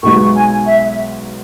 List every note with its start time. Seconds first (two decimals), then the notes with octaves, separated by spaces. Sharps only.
0.03 B1 B2 G#3 D#4 F#4 C#6
0.35 G#5
0.66 E5